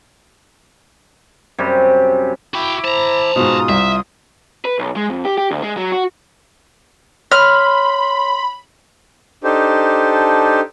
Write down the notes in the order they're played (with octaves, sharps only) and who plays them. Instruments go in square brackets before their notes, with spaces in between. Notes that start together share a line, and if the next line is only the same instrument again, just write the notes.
[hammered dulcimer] F#2 C3 G3
[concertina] E4 B5 D6 [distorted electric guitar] F#4 G5
[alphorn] C5 [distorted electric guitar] A5 A#5
[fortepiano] G#2 B2 [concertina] F4 D#6
[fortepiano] C2 [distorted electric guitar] E5
[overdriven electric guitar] B4
B1
G#3
F2
G4
G4
D2
G#3
F#3
F#4
[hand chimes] C#5 [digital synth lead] B5 [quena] C6 [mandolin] F6
[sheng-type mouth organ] D4 D#4 G4 A4 C5